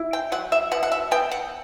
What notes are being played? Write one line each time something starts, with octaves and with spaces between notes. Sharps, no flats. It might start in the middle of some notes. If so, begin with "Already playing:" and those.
Already playing: E4
G5
F#3 F#5
E5
B2 F#5
F#5
E5
B3 G5
F#5